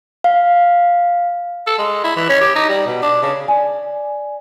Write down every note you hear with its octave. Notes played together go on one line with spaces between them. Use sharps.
F5
A4
G#3
E4
E3
C#4
G4
D#4
G3
B2
D4
C#3
D5 G#5